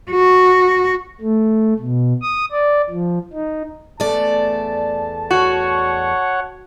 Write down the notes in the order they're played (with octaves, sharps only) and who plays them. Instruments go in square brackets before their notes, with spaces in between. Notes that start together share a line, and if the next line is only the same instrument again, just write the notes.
[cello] F#4
[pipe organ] A3
B2
D#6
D5
F3
D#4
[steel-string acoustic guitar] E2 A3 D5 [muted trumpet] A5
[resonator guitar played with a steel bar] F#4 [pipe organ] C#5 F#5